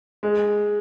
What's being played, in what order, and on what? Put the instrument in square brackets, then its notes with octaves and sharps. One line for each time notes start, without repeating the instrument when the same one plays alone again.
[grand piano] G#3